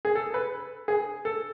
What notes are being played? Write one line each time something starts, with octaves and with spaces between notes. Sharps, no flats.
G#4
A4
B4
G#4
A4